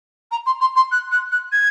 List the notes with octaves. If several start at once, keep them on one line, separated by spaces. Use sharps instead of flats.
A#5
C6
C6
C6
F#6
F#6
F#6
G#6